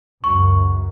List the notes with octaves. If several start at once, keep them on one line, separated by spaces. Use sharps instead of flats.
C#2 F#2 C#6